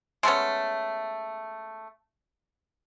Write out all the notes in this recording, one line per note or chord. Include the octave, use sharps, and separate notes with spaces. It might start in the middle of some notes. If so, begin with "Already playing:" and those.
G#3 A3 B3 C#4